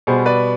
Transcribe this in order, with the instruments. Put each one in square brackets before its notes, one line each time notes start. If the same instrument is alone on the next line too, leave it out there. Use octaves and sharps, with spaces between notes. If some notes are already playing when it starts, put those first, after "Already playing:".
[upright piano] B2 G3 B3 G#4 C5
B4 D5